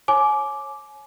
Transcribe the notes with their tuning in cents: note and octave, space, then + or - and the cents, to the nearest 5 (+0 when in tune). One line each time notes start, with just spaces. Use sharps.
C#5 -25 G#5 +35 D6 +0